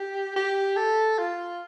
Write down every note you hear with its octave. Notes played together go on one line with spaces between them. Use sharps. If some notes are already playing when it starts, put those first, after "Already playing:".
Already playing: G4
G4
A4
F4